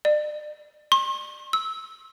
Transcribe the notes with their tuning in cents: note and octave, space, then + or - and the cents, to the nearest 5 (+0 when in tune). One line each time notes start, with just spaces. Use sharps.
D5 +35
C6 +40
E6 -15